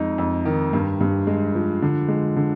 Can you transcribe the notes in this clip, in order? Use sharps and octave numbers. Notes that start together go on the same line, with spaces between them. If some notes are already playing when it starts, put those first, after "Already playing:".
Already playing: F2 G#3 D#4
F2
D#3
G2
G2
G#3
F3
D3
G#3
D3